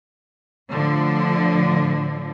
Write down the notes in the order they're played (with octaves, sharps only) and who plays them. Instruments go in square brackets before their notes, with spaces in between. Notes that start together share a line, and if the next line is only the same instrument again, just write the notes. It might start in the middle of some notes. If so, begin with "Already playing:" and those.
[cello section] A2 D3 F3